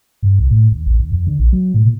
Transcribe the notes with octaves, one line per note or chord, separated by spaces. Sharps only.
G2
C2
A2
D#2
A1
D#2
F2
D3
A#1
F#3
A2
A#2